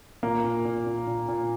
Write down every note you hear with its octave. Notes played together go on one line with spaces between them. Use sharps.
A#2 A#3
A#2
A#2
A#2
A#2
A#2